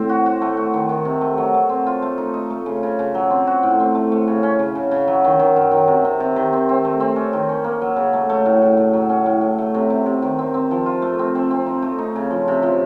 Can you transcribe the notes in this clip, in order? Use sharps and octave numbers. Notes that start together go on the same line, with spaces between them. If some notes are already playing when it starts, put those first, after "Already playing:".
Already playing: A2 C4
F#4
F#4
A3
F#4
D#3
D#3
C3
A3
F#3
A3
C4
F4
A3
D#4
D#4
A3
C#3
C#3
C#3
F#3
C4
F#4
A2
C4
A3
A3
C#3
C#4
C#3
C#3
C#3
F#3
D#3
D#3
F#2
D#3
C3
C3
C3
D#3
C4
C4
A3
C4
C#4
D#3
C#4
A#3
F#3
C#3
A3
A3
A2
A2
A2
F#3
C#4
A2
A2
A3
C3
C3
C3
D#3
C4
C4
F3
F4
A3
C4
C4
C4
D#4
A3
D#4
C#3
F3
C3
F3